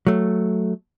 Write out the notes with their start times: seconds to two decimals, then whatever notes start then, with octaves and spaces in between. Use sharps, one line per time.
0.07 F#3 A3